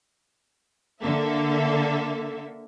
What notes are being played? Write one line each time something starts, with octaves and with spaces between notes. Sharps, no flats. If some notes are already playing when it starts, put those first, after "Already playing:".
D3 A#3 A4 E5